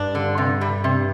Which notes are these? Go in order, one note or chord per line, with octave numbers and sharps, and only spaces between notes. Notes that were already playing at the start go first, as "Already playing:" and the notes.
Already playing: G2 D4
D3
C3
G3
C3